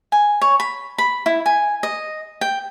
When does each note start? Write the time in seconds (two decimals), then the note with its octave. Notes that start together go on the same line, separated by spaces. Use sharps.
0.12 G#5
0.41 C#5
0.60 B5
0.98 B5
1.26 E4
1.46 G#5
1.83 D#5
2.41 G5